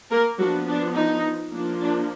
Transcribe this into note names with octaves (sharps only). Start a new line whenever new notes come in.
A#3 A#4
F3 F#3 B3 D4 F#4
D4
D#4
F3 A#3 D4
D4